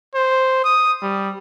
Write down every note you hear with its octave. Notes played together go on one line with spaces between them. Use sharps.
C5
D#6
G3